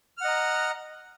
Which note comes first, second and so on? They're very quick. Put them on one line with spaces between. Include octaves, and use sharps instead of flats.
F6 F#5 D#5 A#5